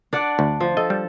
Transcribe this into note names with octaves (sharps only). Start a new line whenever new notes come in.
D4 D5 F#5
D2
F3
A4 D#5
G3